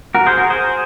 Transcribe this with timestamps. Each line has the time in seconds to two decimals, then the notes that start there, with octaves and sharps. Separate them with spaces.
0.15 F#4 A#4
0.26 G#4 C5
0.38 F#4 A#4
0.50 G#4 C5